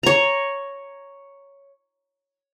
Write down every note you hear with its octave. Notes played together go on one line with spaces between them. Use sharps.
C#5 A#5